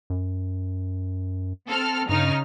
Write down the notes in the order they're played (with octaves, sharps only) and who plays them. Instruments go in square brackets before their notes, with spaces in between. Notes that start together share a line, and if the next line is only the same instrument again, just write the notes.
[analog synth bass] F#2
[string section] C4 A4 F6
[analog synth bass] G2 [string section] C#3 D#4 F6